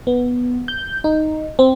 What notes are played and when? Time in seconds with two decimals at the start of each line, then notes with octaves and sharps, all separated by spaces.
0.07 B3
0.68 G6
1.04 D#4
1.59 C4